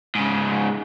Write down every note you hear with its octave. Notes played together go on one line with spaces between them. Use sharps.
G#2 C#3